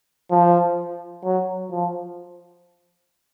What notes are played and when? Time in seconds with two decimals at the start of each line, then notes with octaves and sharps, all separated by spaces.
0.31 F3
1.24 F#3
1.71 F3